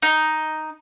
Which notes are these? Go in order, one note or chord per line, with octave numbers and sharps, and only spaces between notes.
D#4